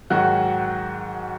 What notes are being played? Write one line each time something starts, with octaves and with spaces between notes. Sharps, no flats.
G#2 D#3 F#3 F#4